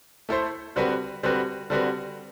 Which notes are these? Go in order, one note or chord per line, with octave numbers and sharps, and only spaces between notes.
A3 E4 A4 C5
D3 G3 C4 F#4 B4
D3 G3 C4 F#4 B4
D3 G3 C4 F#4 B4